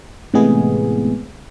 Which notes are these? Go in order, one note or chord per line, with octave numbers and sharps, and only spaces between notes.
A2 C3 E3 G#3 B3 G#4